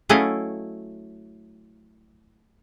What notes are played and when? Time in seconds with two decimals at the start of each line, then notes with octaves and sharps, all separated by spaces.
0.09 F#3 A3 C#4 E4 D#5 F5